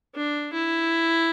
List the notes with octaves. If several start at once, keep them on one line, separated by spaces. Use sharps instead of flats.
D4
E4